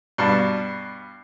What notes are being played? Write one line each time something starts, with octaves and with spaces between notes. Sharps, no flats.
G2 B2 A5